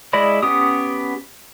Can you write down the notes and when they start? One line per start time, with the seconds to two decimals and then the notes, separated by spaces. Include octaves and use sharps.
0.13 G#3 E4 D5 D#5 B5
0.42 B3 C#4 G4 D#6